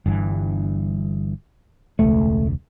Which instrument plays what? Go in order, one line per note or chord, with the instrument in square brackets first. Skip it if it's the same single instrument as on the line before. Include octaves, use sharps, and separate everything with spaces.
[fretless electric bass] G1 G2 E3
[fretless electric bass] E1 C#2 [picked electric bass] A3